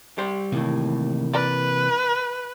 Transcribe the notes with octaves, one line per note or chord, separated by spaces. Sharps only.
G3 G4 C5
D#2 A2 C3 E3 A#3
B4 D5